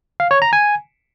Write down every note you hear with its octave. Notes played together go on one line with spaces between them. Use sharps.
F5
C#5
A#5
G#5